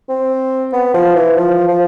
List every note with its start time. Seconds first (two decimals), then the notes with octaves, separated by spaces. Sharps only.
0.09 C4
0.73 B3
0.94 F3
1.16 E3
1.37 F3
1.68 F3